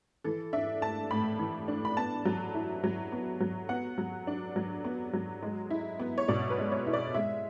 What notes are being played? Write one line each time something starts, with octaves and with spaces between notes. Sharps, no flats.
E3 A4
D4 E5
A3 A5
A2 B5
E3
D4
B5
B3 A5
F#3
E4
F#3
B3
F#3
B3 F#5
F#3
D4
F#3
B3
F#3
G#3
E4
B3
C#5
B2 D5
B4
G#3
C#5
E4
D5
G#3 E5